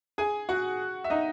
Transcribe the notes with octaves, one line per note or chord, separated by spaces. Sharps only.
G#4 G#5
F#4 F#5
E5
D#4 D#5